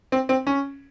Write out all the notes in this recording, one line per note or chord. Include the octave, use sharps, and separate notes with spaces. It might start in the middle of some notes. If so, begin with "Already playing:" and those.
C4
C4
C#4